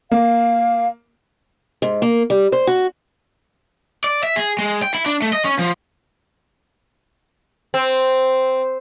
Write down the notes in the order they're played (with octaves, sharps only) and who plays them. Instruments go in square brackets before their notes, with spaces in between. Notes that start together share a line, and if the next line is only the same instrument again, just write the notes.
[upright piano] A#3 [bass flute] F5
[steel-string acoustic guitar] G#2
A#3
G3
C5
F#4
[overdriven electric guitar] D5
E5
G#4
G#3
G5
E4
D4
A3
D#5
C#4
F3
[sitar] C4